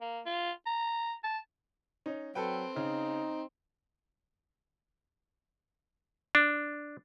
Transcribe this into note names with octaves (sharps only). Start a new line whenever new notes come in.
A#3
F4
A#5
A5
C#4 D#4
F#3 C4 A4 B4 G5
C#3 D#4
D4